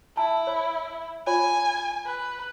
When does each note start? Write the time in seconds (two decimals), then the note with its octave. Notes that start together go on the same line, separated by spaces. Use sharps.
0.17 E4 A5
0.47 C#5 B5
1.27 F4 C#5 G#5 B5
2.06 B4